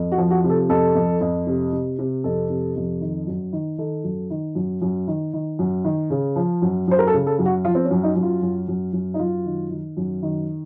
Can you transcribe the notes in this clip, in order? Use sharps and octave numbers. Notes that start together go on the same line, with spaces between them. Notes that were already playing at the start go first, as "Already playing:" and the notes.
Already playing: F2
F#4
F3
F#4
C3
A4
F2 A4
F2
F2
C3
C3
C3
F2 A4
C3
F2
D#3
F#2
D#3
D#3 A4
F#2
D#3
F#2
F#2
D#3
D#3
F#2
D#3
C#3
F3
F#2
F#2 C5
A#4
A4
C#3
A4
F#2
F#4
F3 F4
C4
C#4
F#2
D#4
F#2
F4
F#2
F#2
F#2
D#4
F#2 F4
D#3
D#3
F#2
D#3